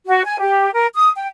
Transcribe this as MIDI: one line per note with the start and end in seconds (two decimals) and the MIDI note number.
0.07 0.22 66
0.25 0.38 80
0.40 0.71 67
0.73 0.87 70
0.94 1.09 87
1.16 1.27 79